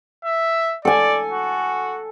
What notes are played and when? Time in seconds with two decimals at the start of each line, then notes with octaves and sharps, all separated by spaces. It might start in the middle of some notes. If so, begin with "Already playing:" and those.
0.25 E5
0.85 A4 D5 G#5
1.31 F#4